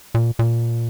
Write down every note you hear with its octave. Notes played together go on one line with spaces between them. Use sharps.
A#2
A#2